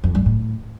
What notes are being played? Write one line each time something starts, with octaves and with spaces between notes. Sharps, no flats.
F2
G2
A2